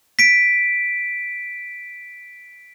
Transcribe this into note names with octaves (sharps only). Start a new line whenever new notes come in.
B6 D7